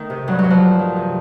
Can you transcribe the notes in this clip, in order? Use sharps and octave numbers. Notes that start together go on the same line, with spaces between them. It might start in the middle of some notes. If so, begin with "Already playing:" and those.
Already playing: D#3 A3
C3
G2 F#3
F#3
G2
F3
D#3
D#3
C3